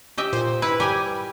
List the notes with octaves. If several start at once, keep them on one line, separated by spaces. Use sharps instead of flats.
G4 D#5 E5
A#2 C5
E4 B4
G3 G4 A#4 G#5